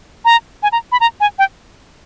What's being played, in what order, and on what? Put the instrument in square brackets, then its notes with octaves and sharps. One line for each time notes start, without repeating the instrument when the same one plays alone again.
[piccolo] A#5
G#5
A#5
B5
A#5
G#5
G5